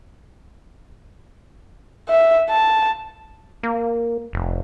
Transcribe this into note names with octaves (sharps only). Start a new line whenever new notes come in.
E5
A5
A#3
F1